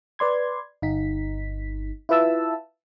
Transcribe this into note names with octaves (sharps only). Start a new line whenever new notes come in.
B4 D5 C6 G#6
G1 D#4 B6
E4 F4 B4 E5 A5 E6